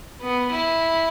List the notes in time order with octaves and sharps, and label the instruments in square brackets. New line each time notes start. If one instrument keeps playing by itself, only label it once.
[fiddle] B3
E4